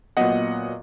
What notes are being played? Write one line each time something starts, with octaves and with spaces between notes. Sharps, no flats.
A#2 F#3 B3 D#5 F#5